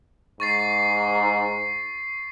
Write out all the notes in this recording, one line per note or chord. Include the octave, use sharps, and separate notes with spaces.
G#2 C#6 A6 C7